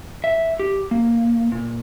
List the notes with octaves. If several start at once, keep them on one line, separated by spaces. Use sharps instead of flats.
E5
G4
A#3
A#2